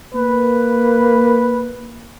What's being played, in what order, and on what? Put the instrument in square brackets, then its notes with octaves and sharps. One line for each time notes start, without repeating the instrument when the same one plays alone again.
[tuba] A#3 [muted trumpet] B4